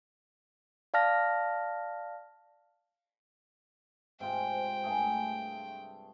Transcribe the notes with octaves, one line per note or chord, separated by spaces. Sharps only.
D5 F5 A5 F6 A#6
G#2 C3 F4 G5
G2 A3 G#4